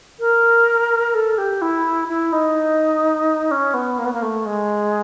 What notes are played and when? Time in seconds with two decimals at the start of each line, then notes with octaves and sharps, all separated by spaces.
0.20 A#4
1.14 A4
1.38 G4
1.61 E4
2.08 E4
2.32 D#4
3.51 C#4
3.74 B3
3.98 A#3
4.05 B3
4.13 A#3
4.22 A3
4.45 G#3